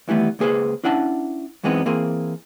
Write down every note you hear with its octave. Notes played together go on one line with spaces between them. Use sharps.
D#2 E3 G3 A3 B3
C#2 A#3 G#4 B4 C5
C#4 D4 E4 F#5 G#5 A5
F#2 E3 G#3 B3 C4 D#4
E3 A#3 C4 G#4